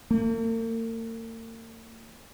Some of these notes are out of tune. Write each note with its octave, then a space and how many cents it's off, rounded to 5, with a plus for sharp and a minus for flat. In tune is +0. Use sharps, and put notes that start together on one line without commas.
A#3 -45